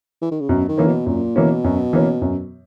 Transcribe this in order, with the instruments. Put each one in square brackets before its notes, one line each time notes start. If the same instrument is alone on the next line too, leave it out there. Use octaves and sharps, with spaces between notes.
[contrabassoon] E3
D#3
C#3
[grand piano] F#2 [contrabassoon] B2
[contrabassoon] D#3
[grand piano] E3 A#3 C#4
[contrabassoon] B2
[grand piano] F#2 [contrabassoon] A#2
[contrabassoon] B2 [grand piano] E3 A#3 C#4
[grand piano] F#2
E3 A#3 C#4
F#2